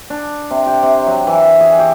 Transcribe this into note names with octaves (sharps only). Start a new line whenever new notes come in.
D4
C3
G4
C3
F#3
E3
G#4
G4